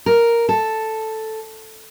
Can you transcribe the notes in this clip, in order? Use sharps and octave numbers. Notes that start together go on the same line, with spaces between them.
A#4
A4